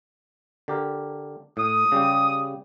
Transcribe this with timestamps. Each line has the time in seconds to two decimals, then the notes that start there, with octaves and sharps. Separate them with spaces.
0.68 D3 G4 A#4
1.57 A2 D#6
1.92 C#3 G3 G4